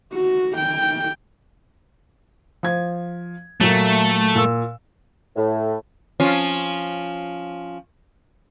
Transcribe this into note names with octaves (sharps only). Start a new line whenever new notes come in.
F#4
G5
F3 G#6
A#2 F#3 A3
A#2 E6
A2
F3 C#4 F4